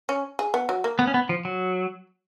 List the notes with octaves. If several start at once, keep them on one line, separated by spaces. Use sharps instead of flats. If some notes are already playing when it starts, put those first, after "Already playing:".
C#4
G#4
B3
F#3
A#3
B3
C#4
B3
F3
F#3